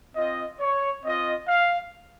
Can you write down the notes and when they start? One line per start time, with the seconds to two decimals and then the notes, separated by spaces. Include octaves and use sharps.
0.15 C4 F4 D#5
0.60 C#5
1.04 C4 F4 D#5
1.48 F5